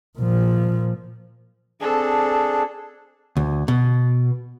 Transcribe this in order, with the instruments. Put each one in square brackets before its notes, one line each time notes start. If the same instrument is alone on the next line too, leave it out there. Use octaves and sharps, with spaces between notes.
[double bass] A#2 F3
[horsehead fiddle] C4 A4 [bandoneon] D4 G#4
[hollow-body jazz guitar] D2
B2